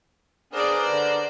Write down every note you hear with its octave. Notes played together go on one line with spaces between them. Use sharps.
B3 D4 G#4 A#4 C5 D5
D3